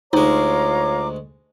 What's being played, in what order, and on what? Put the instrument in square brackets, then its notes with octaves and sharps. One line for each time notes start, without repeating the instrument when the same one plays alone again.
[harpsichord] D2 G#3 [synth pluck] D#4 [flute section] F4 A#5 D6 [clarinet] C#5